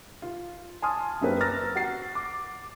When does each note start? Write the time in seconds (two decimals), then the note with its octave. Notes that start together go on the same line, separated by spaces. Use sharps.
0.22 F4
0.82 G#5 A5 C6 D#6 F6
1.21 F#2 A#3 C4 A#4 B4
1.40 A#5 E6 F6 A6 A#6
1.75 F#4 F#5 A6 C7
2.15 D6